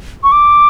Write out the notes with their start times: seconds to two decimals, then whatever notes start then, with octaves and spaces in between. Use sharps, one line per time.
0.23 C#6
0.32 D6